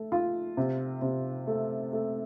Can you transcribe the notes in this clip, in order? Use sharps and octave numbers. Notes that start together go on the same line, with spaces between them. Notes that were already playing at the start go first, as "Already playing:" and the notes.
Already playing: A3
F4
C3
C3
A3
A3